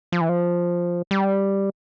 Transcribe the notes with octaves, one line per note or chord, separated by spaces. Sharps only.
F3
E3
F3
G3